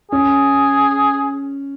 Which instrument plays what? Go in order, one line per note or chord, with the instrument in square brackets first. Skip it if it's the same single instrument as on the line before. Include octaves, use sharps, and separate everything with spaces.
[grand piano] C#4 [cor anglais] G#4